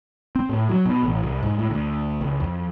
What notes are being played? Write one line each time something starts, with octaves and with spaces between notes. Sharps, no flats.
C4
A2
F#3
B2
A1
C2
G#2
A2
D2
C#2
F2